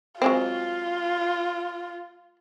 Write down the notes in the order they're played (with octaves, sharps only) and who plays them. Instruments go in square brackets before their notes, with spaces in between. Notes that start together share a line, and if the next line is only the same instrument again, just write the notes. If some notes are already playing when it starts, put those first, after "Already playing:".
[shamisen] F#3 G#3 C4 [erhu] F4